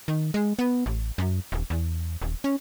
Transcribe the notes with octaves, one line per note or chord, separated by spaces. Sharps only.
D#3
G#3
B3
A1
F#2
D#1
E2
D#1
C#4